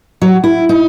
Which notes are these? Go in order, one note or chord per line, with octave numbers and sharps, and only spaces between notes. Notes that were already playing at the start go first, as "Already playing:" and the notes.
F#3
E4
D#4